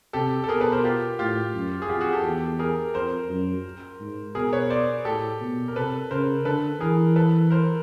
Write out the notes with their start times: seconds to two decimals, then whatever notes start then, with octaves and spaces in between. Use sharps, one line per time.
0.13 C3 G4 A4
0.44 A4
0.49 B2 G#4 A#4
0.60 A4 B4
0.72 A#4 C5
0.84 F4 G4
1.19 A2 F4 G4
1.54 F#2
1.82 G#4
1.89 F2 F4 G4
2.01 F#4 G#4
2.13 G4 A4
2.24 E2 G4 A4
2.59 G#4 A#4
2.94 F2 A#4 C5
3.29 F#2
4.00 G#2
4.35 B2 G#4 A#4
4.53 B4 C#5
4.70 C5 D5
5.05 A2 G4 A4
5.41 B2
5.68 A#4
5.75 C3 A4 B4
6.11 C#3 A#4 C5
6.45 D3 A4 B4
6.80 E3 G#4 A#4
7.16 A4 B4
7.50 A#4 C5